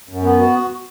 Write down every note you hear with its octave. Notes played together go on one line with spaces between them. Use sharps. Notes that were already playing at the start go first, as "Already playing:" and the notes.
F#2
B3
F#4